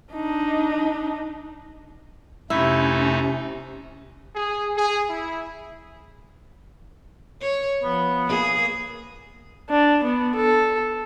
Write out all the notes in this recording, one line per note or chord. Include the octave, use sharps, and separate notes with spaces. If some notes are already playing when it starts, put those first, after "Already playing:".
D4 D#4
F2 C3 A3 C#4 D#4 E4
G#4
G#4
E4
C#5
F3 B3
A#3 G#4
D4
B3
A4